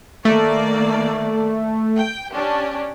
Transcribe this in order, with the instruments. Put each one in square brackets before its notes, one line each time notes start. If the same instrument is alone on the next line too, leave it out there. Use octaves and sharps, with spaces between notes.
[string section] D#3 A#3 D5 [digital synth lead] A3
[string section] G5
C#4 D4 G4